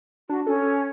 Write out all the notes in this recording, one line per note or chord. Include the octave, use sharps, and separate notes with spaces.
D4 F#4
C#4 A4